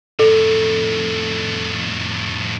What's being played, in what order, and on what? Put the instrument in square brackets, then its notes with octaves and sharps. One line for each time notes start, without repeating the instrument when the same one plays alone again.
[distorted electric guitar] F2 A2 [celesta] A4